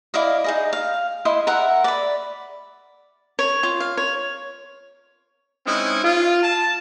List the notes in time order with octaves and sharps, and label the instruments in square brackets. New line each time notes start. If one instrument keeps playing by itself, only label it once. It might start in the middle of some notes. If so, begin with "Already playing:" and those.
[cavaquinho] E4 D5 D#5 F5
D#4 G#4 D#5
F5
E4 D#5 C6
A#4 E5 F#5
D5 B5
C#5
F4
F5
C#5
[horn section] G#3 C4 C#4 D#4 E4
F4
A5